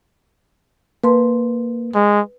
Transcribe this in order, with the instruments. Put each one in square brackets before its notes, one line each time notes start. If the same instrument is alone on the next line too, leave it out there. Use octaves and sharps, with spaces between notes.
[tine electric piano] A#3 [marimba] B4 A5 C6
[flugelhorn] G#3